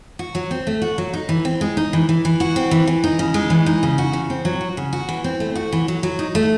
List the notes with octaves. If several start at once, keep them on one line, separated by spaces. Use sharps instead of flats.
F#4
F#3
C4
A3
F#4
F#3
D#4
E3
C4
G#3
D#4
E3
E3
E3
F#4
C4
E3
E3
D#4
C#3
G#3
E3
D#4
C#3
F#4
C#3
C4
F#3
F#4
C#3
F#4
E3
C4
A3
F#4
E3
F#3
F#3
D#4
A3